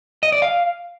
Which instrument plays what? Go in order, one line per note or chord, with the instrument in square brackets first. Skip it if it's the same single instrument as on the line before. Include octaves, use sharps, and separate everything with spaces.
[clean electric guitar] D#5
D5
F5